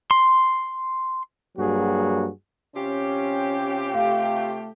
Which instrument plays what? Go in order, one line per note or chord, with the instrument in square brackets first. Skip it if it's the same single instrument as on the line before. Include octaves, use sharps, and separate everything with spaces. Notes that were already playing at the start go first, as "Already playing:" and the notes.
[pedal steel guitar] C6
[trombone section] G2 F#3 A#3 F#4 G#4
[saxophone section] C3 F4 G4 [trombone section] C#4
[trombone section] A3 [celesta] F5